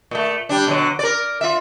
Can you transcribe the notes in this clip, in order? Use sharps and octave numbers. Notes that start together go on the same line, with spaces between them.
A#2 A3
G3 D4
B2 D3 F#3
A#4 D5
F4 E5